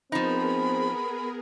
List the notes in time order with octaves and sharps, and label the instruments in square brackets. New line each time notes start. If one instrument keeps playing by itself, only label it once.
[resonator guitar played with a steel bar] F3 D#4 [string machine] B3 G#4 A#4 [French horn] C4 [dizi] B5